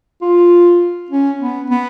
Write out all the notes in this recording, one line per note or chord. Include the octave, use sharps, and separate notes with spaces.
F4
C#4
B3
B3